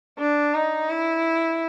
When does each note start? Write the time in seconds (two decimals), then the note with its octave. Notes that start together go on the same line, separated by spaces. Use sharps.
0.19 D4
0.54 D#4
0.90 E4